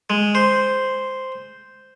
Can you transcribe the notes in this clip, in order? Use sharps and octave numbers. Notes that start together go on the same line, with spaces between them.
G#3
C5